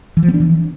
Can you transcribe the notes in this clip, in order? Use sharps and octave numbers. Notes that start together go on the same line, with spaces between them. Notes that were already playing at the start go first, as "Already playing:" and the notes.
E3
F3
B3
D4
E3